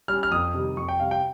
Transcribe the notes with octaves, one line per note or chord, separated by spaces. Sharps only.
G3 C#4 F6
F6
F2 D#6
C3 D#3 G3
F2 C#6
G5
C3 G3 F5
G5